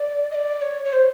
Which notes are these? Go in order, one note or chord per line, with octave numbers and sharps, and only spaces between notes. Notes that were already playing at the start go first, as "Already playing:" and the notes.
Already playing: D5
D#5
D5
C#5
C#5
C5